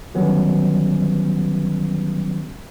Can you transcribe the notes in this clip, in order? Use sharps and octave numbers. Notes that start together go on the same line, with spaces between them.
D3 D#3 F#3 G3 B3 C#4